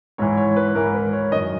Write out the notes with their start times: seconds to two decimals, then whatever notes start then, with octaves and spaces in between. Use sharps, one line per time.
0.18 G#2 E3 C#5
0.37 C#5
0.56 B4
0.75 G#2 E3 A#4
0.94 B4
1.13 C#5
1.32 F#2 D#3 D#5